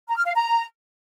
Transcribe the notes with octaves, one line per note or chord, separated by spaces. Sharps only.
A#5
F6
F5
A#5